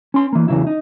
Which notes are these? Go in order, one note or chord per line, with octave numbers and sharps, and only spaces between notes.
C#4 C6
E3 A#3
E2 A2 C#3 F#3 E4
D#4